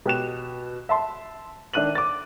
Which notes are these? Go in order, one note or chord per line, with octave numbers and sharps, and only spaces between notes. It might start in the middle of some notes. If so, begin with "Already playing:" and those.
B2 G4 F#6 E7
E5 A5 C6
D#3 D4 E5 F#6 D#7 F#7
D6 A6